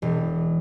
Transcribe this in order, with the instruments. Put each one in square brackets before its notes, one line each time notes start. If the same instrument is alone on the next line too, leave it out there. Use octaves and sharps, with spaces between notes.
[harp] E1